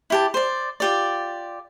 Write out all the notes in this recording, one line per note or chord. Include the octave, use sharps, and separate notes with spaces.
E4 G4 A5
C5 D5
F4 G4 D5